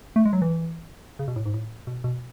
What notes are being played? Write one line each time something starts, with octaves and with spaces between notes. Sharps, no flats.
A3
G#3
F#3
E3
C#3
B2
A2
G#2
A2
B2
B2